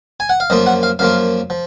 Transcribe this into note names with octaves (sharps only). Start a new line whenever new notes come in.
G#5
F#5
F5
F#2 F3 A#3 F4 D#5
F#5
F5
F#2 F3 A#3 F4 F5
F3